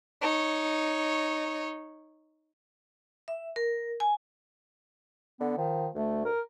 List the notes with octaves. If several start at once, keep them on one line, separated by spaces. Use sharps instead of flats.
D#4 C#5
E5
A#4
G#5
D3 B3
D#3 F3
D2 A3
A#4